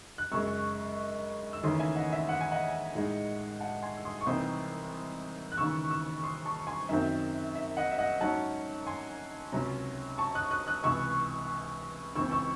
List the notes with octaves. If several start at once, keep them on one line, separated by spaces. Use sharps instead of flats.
F#6
F#2 C#3 G#3 C#6 E6
E6
D#2 C#3 E3 A3 C#4 C6 D#6
E5 G#5
D#5 F#5
E5
F#5
G#5
D#5 F#5
A2 G#3 D#4
F#5 A5
G#5 C6
E6
C6 D#6
C#6
C2 C3 E3 C4 D#4 C6 D#6
F#6
D#2 C#3 E3 C#6 E6
C#6 E6
C6 D#6
A5 C#6
G#5 C6
F#2 D#3 F#3 C4 E5
E5
D#5 F#5
E5
D#5 F#5
G#2 F#3 C#4 F#5 A5
G#5 C6
C#2 C3 F#3 C#4
A5 C#6
D#6 F#6
D#6 F#6
D#6 F#6
C#2 C3 E3 C#6 E6
C#2 C#3 E3 C4 C#6 E6
C#6 E6